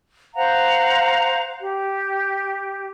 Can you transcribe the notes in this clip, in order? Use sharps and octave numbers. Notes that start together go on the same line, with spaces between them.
C5 F5 F#5 A#5
G4